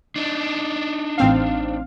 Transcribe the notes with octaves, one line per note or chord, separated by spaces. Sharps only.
D4 D#4
A1 C4 F5